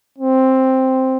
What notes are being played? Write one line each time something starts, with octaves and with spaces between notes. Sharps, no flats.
C4